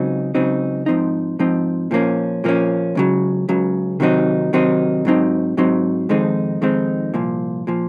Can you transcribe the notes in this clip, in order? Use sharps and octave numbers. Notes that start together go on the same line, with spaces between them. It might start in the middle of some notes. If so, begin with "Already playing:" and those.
Already playing: C#2 C#3 F#3 C4 D#4
C#2 C#3 F#3 C4 D#4
G#2 F3 C4 D#4
G#2 F3 C4 D#4
A#2 F3 A#3 C#4
A#2 F3 A#3 C#4
C#2 C#3 F#3
C#2 C#3 F#3
C3 D#3 F#3 C4 D#4
C3 D#3 F#3 C4 D#4
G#2 F#3 C4 D#4
G#2 F#3 C4 D#4
F2 D#3 G#3 C4 D#4
F2 D#3 G#3 C4 D#4
C2 A#2 F3
A#2 F3